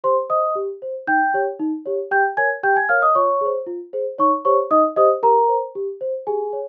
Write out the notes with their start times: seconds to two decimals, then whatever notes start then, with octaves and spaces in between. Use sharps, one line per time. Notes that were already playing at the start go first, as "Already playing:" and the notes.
0.04 G4 C5 C6
0.29 C5 D#5 D#6
0.56 G4
0.82 C5
1.07 D#4 G5 G6
1.34 G4 C#5
1.59 D#4
1.86 G4 C#5
2.11 G4 G5 G6
2.37 A#4 C#5 G#5 G#6
2.63 G4 G5 G6
2.76 G#5 G#6
2.89 A#4 C#5 F5 F6
3.02 D#5 D#6
3.15 F4 C#5 C#6
3.41 G#4 C5
3.67 F4
3.93 G#4 C5
4.18 D#4 C#5 C#6
4.45 G4 C5 C#5 C#6
4.71 D#4 D#5 D#6
4.96 G4 C5 D#5 D#6
5.23 G4 A#4 A#5
5.48 C5
5.75 G4
6.01 C5
6.27 G4 G#4 G#5
6.53 C#5